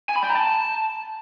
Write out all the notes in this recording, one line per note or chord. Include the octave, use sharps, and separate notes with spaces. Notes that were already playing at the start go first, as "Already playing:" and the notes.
G#5
B5
G5
A#5
A5